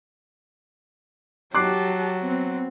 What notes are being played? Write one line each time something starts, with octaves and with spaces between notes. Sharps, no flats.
F#3 G4 A5 D6 F#6 C7
B3 C4